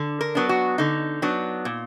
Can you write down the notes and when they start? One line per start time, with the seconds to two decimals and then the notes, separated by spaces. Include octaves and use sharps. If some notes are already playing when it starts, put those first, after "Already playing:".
Already playing: D3
0.21 A#4
0.35 F#3 B3 D4
0.49 F#4
0.78 D3 D#4
1.22 F#3 B3 D4
1.65 A#2